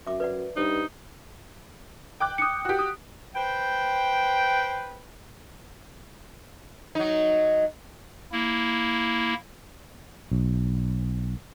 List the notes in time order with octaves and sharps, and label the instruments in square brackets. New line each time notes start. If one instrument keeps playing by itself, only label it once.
[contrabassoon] F#2 [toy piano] E5 D6
[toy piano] B4 D5 F#5
[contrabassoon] G2 [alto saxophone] D#4 [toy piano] C5
[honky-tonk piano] G5 D6 F#6
[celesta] D#6 C#7
[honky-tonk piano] F#4 G4
[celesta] D#6
[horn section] B4 C5 G5
[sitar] F#3 D#4
[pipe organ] A#3 E4
[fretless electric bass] B1